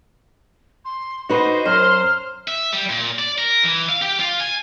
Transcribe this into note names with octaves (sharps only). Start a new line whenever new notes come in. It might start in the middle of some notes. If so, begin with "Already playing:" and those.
C6
D#4 F#4 B4 C5 D#5
F#2 C5 F6
E5
G3
A#2
D5
A#4
E3
F5
G4
F4
G#5